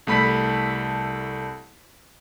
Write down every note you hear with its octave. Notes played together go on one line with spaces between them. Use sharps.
C2 A3 B5 B6